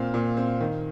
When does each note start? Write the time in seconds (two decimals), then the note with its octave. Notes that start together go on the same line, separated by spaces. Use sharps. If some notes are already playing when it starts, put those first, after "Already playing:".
Already playing: A#2 C4 F5
0.14 A#2
0.37 C4
0.60 D#3